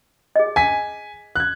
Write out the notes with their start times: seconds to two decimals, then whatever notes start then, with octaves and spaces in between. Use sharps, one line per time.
0.36 G#4 D#5
0.56 G#5 B6
1.36 F#6 G#6